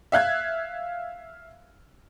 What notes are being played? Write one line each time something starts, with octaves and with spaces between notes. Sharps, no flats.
E5 F5 F#6 G#6